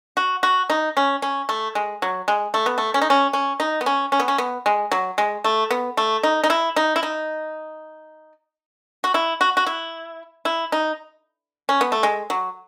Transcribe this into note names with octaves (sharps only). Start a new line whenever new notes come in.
F#4
F#4
D#4
C#4
C#4
A3
G#3
F#3
G#3
A3
B3
A3
C#4
D#4
C#4
C#4
D#4
B3
C#4
C#4
B3
C#4
B3
G#3
F#3
G#3
A3
B3
A3
D#4
D#4
E4
D#4
E4
D#4
F#4
E4
F#4
F#4
E4
E4
D#4
C#4
B3
A3
G#3
F#3